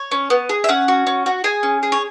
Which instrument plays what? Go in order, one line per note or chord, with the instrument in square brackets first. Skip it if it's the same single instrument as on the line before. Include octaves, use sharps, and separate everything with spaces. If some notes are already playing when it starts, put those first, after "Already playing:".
Already playing: [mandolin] C#5
C#4
B3
G#4
E5
C#4 F#5
F#4
C#4
F#4
G#4 G#5
C#4
G#4
C#5